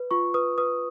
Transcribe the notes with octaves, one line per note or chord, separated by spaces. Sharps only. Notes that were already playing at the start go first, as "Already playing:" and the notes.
Already playing: B4
F4 C#6
B4 D#6
B4 D#6